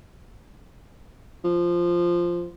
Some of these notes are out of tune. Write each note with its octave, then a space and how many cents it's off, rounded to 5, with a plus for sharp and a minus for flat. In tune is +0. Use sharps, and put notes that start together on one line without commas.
F3 -5